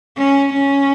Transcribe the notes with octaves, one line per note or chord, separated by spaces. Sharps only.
C#4
C#4